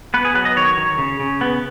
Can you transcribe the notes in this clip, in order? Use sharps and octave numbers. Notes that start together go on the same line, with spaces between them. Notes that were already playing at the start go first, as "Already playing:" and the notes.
B3 B4
G#4
F#3 B4
D#5
D#3 C#5
D#3
C#3
C#3
B3